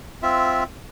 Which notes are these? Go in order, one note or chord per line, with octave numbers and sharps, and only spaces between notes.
C4 F4 E5